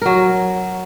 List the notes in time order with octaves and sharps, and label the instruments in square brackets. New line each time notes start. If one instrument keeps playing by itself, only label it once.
[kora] F#3 A#4